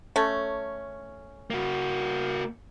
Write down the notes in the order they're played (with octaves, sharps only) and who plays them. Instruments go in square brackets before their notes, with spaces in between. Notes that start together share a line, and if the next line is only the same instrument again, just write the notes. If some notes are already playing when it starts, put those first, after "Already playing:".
[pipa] A3 C#4
[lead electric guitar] A#3 F#4